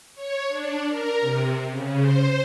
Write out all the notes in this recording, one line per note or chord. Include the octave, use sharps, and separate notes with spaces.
C#5
D4
A#4
C3
C#3
C5